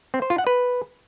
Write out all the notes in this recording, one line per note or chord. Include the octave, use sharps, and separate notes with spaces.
C4
C5
F4
F#5
B4